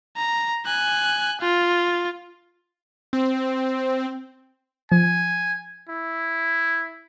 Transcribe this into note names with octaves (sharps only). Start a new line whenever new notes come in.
A#5
G#5 F#6
F4
C4
F3 G#5
E4